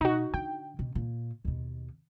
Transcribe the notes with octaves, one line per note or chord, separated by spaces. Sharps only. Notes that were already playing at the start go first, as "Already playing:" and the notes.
B2 D#4 F#4
D3 G5
B2
A#2
D#2 B2